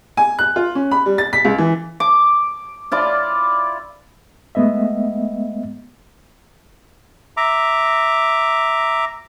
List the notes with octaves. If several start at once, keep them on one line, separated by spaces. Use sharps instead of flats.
G#5
F#6
F4
C#4
B5
G3
A6
B6
C#2
E3
D6
E4 F4 D5
G#3 A3 B3 D#5 E5
E5 A#5 D6